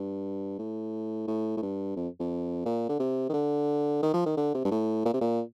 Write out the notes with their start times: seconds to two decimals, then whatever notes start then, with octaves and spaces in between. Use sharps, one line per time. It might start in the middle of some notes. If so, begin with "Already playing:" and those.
Already playing: G2
0.59 A2
1.28 A2
1.57 A2
1.62 G2
1.96 F2
2.20 F2
2.66 A#2
2.89 D3
3.00 C3
3.30 D#3
3.34 D3
4.02 D#3
4.14 F3
4.26 D#3
4.37 D3
4.54 C3
4.65 G2
4.71 A2
5.05 A#2
5.14 C3
5.21 A#2